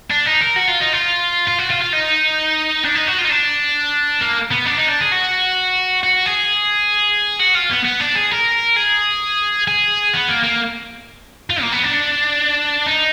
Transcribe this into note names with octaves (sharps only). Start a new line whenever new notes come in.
D4
D#4
A#4
F#4
F4
D#4
F4
F4
F#4
F4
F4
D#4
D4
D#4
F#4
F4
D#4
D4
A#3
B3
D4
D#4
D4
G#4
F#4
F#4
G#4
F#4
F4
B3
B3
D4
G#4
A#4
G#4
G#4
B3
A#3
A#3
F4
A#3
B3
D4
D#4